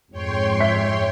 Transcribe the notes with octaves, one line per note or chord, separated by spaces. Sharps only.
F2 G#2 G#3 C#5 G5 C6
E5 B6